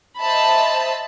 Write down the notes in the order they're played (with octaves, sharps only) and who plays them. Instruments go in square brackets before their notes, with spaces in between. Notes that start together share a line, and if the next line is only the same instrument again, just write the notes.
[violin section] C5 D#5 E5 A5 B5